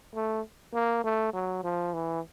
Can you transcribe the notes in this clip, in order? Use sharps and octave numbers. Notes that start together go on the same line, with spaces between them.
A3
A#3
A3
F#3
F3
E3